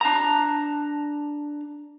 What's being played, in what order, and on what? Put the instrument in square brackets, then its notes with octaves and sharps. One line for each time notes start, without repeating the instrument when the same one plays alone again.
[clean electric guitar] D4 A5 A#5